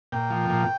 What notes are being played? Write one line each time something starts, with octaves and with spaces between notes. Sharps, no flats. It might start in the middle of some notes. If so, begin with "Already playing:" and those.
A#2 G5
F3
A#2